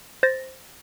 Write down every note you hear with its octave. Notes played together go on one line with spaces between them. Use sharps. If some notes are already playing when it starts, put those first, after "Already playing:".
C5 A6 A#6